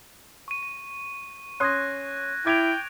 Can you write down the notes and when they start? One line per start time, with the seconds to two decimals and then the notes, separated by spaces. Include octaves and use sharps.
0.48 C#6 D#7
0.63 D#7
1.60 C#4 C6 D#6 F#6 G#6 A#6
2.46 E4 G5 D6 F#6 G#6 D7 F7